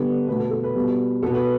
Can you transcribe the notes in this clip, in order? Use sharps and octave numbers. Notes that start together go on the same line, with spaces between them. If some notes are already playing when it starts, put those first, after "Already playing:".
Already playing: D3 G3 B3 A4
B2 A3 B4
A4
A4
B4
B2 G3 B3
B2 B3 A4
B4